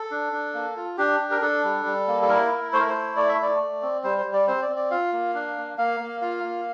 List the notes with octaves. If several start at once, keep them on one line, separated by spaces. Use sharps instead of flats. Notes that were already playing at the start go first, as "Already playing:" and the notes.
Already playing: A4
D4
D4
A#3
F4
D4 G4
D4
A#4
D4 A4
G3
G3
A#3
A4
E4 A#4
E4
A3 C5
A#4
C5
E4
A3 D5
E5
A3 D5
A3
C4
G3 C5
C5
G3
D5
C4 C5
D5
C4
D5
F4 F5
A#3
D4
A#3
A#3 F5
A#3
F4 F5
A#3